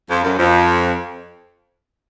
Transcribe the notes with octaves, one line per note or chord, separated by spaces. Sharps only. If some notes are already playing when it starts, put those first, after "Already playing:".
F2
F#2
F2